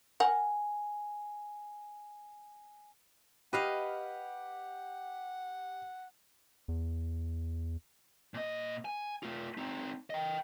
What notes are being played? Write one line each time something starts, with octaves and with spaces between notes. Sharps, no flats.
A#4 F#5 G#5
G4 B4 D#5 F5 F#5
E2
A#2 D#5
G#5
A3 F4
C4 D#4
D#5 G5